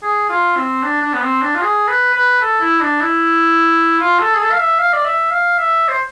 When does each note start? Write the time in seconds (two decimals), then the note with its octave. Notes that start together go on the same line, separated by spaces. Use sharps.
0.03 G#4
0.29 F4
0.56 C4
0.83 D4
1.02 D4
1.13 B3
1.22 C4
1.42 D4
1.55 F4
1.62 G#4
1.88 B4
2.14 B4
2.41 A4
2.61 E4
2.81 D4
3.01 E4
4.00 F4
4.19 A4
4.34 G#4
4.40 A4
4.51 F5
4.59 E5
4.79 F5
4.93 D5
5.05 E5
5.31 F5
5.58 E5
5.88 C5